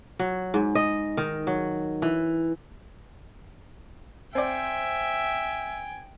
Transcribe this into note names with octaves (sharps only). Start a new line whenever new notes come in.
F#3
G#2
D#5
D#3
F#3
E3
C4 D5 E5 G5 G#5